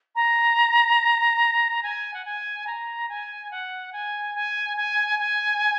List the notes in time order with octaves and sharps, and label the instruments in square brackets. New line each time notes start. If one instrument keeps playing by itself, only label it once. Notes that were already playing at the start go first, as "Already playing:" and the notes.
[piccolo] A#5
G#5
F#5
G#5
A#5
G#5
F#5
G#5
G#5
G#5
G#5